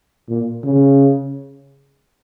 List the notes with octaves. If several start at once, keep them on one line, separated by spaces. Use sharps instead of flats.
A#2
C#3